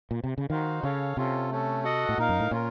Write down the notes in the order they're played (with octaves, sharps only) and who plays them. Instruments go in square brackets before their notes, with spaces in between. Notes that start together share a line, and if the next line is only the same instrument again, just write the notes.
[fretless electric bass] A#2
C3
C#3
[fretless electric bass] D#3 [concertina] D#4 F#4 C5 F5
[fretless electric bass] C#3 [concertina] C#4 A4 C#5 F5
[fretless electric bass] C3 [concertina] C#4 F4 A4
[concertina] A3 C#4 A4
F#4 A4 D#5 F#5
[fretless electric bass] A2
[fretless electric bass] A#2 [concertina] D#4 A#4 F5
[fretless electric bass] F#2
A2
[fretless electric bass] A#2 [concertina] C#4 F4 A#4